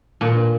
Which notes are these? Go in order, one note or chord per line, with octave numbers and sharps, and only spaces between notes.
A#2